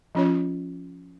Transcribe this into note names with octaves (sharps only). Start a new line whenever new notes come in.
F3 C#4 F4 C#5